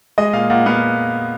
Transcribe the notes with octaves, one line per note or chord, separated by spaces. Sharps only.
G#3 D#5
A#2 F5
A#2 F#5
B3 F5